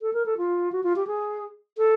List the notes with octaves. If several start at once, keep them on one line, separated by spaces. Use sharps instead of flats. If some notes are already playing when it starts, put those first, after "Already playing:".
A4
A#4
A4
F4
F#4
F4
G4
G#4
A4